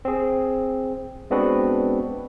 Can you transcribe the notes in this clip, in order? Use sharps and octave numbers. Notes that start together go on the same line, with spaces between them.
C4 G#4
G#3 B3 C4 D4 F#4 B4